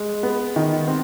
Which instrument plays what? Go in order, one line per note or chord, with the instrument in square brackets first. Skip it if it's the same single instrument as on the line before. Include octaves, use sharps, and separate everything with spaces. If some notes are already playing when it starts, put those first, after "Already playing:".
Already playing: [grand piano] G#3
B3
D#3
C4